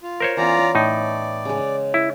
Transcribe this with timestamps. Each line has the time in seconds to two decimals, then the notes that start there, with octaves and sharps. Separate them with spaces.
0.03 F4
0.20 A#4 C5 C#5
0.37 E3 B3 C#4 F4 D5 A#5
0.75 A2 D#4 D5
1.45 C#3 G#3
1.94 E4